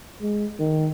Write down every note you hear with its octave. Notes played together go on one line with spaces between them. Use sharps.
G#3
D#3